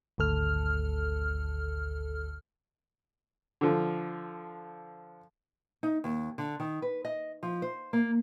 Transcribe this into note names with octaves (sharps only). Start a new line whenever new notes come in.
G#1 D2 A4 F6
D3 F3
D#4
D#2
D3
D#3
B4
D#5
F3
C5
A#3